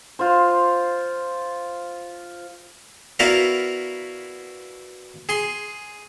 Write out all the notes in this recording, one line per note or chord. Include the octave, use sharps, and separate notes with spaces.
F4 C5
B3 E4 F#4 A#4 D5 F5
G#4 C6